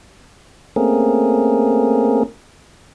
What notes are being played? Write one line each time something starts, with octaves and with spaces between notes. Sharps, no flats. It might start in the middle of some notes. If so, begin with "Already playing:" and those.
A3 A#3 C4 C#4 G#4 A#4